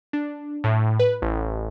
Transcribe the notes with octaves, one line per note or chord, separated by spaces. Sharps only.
D4
A2
B4
A1